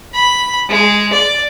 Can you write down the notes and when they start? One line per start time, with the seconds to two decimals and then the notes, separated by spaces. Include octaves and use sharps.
0.14 B5
0.69 G#3
1.13 D5